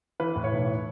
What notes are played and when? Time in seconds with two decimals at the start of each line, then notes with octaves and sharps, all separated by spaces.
0.20 E3 B4
0.36 A2
0.44 C#5
0.52 B1